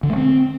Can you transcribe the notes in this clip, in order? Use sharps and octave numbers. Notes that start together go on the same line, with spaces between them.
D3
A3
C4